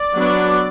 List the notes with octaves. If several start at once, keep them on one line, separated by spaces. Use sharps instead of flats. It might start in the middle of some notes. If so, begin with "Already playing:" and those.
Already playing: D5
F#3 B3 D4